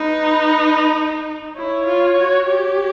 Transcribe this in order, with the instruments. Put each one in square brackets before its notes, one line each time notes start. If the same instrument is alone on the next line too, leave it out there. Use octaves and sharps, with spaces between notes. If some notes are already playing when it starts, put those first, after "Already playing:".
Already playing: [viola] D#4 [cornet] B4
[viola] E4 [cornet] C#5
[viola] F4
F#4
G4